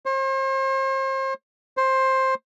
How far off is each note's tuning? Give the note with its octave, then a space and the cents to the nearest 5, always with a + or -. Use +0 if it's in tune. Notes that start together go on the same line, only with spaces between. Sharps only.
C5 +40
C5 +15